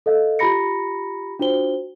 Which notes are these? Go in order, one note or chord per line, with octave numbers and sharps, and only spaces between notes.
A4 D#5 F5
F4 G4 A#5 B5 A#6 C#7
D4 F4 F#4 C5 G7